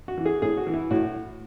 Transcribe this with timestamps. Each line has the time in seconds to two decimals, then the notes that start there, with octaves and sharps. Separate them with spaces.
0.08 F#4
0.17 E3
0.26 G#4
0.42 A2 G#4
0.57 F#4
0.67 E3
0.74 E4
0.91 A2 F#4